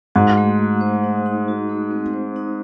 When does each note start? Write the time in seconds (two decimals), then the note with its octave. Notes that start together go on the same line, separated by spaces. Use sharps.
0.15 G#2 F#4
0.37 A3
0.59 A3
0.81 C5
1.04 D#4
1.26 D#4
1.48 F#4
1.69 A3
1.91 C4
2.13 C5
2.36 D#4